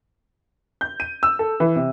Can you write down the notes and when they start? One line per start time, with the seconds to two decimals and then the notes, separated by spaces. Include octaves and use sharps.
0.81 G6
1.00 D#7
1.23 E6
1.39 A4
1.60 E3
1.76 C3